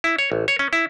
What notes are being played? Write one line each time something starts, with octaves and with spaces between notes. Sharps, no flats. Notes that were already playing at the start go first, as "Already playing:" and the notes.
E4
C#5
A1
C#5
C#4
E4